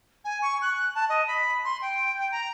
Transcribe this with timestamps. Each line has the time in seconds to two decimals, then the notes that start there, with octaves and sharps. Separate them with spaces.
0.24 G#5
0.42 C#6
0.62 F#6
0.75 F#6
0.95 A5
1.09 D#5
1.27 B5
1.64 C6
1.81 G5
2.17 G5
2.31 A#5